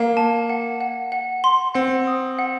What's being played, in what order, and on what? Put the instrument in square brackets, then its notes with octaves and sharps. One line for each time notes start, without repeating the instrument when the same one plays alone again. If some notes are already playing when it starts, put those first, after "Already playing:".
Already playing: [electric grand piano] A#3 [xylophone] F5
[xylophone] A5
F#5
F#5
F#5
C6
[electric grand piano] C4 [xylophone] F#5
[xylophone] D#6
F#5